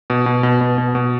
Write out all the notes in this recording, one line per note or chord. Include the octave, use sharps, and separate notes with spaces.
B2
B2
B2
B2
B2
B2